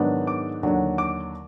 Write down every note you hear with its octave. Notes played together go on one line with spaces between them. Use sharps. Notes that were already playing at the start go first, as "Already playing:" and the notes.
Already playing: G#2 D#3 F#3 B3 D4
D6
D#2 D3 F#3 D4
D6